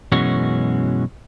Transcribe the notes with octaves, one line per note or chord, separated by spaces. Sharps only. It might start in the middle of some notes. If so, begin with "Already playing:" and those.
F#2 B2 E3 G#3 C#4 F#4